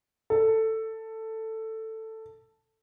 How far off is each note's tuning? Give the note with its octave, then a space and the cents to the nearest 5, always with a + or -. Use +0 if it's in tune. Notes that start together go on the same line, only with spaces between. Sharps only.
A4 +10